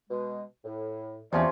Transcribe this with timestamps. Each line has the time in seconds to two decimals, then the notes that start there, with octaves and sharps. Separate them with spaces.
0.10 B2 G#3
0.64 A2
1.33 E2 C3 F3 C#4 D5